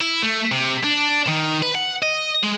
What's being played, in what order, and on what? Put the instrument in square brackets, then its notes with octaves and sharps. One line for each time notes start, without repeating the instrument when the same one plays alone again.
[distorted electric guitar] E4
A3
C3
D4
D#3
B4
F#5
D#5
G#3